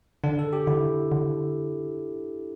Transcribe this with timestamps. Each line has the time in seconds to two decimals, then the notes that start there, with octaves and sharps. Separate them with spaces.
0.24 D3 D4
0.39 A4
0.53 G4
0.67 D3 E4
1.12 D3